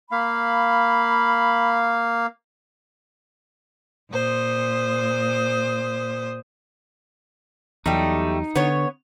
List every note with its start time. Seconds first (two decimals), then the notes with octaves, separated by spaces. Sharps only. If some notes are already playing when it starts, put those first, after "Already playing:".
0.12 A#3 F5 B5
4.11 A#2 C5 D#6
7.86 E2 F#3 G3 A3 D#4
8.56 D3 B3 C#5